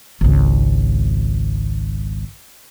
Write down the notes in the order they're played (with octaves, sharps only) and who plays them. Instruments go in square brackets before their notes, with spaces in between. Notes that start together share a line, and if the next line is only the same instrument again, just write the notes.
[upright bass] G#1 C#2